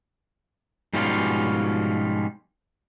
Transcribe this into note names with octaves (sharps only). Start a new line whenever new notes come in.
G#2 B2 F3 G3 C#4 F4